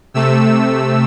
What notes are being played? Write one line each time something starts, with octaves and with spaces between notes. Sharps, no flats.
C3 A3 E6